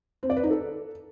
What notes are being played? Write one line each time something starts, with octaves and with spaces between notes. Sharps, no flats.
C4
D5
B4
D#4
A4